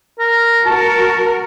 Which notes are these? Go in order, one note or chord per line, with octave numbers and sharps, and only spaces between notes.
A#4
F#4 A#4 A5